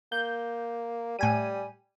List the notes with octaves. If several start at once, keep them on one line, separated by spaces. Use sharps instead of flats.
A#3 G6
A2 G3 G#5 D#7